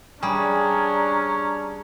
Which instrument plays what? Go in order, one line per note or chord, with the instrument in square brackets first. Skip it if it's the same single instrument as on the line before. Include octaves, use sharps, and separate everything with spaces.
[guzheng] G3 G#4 [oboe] C#4 [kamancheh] D4 [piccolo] A#5